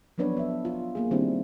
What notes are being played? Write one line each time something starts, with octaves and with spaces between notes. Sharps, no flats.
F3 F#3 B3 D4 B4 C#5
B3 E5
F4
A#3 G#4
D#3 G3 C4 D4 E4